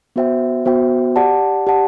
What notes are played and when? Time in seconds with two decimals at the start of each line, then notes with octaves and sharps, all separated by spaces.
0.16 B3 F#4 C5 E5 G5
0.65 B3 F#4 C5 E5 G5
1.16 G4 D5 F#5 A5
1.67 G4 D5 F#5 A5